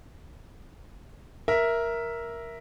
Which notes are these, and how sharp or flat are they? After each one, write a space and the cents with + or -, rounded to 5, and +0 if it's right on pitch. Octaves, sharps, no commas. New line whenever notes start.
A#4 +5 E5 +0